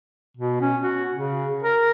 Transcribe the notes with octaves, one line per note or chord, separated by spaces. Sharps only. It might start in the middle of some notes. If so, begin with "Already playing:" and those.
B2
C#4
F#4
C#3
A#4